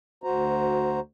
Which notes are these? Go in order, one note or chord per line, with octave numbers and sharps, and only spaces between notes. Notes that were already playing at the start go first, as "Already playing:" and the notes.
D2 F#4 C5 A#5